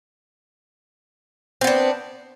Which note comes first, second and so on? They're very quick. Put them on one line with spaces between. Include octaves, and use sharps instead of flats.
C4 B3 D4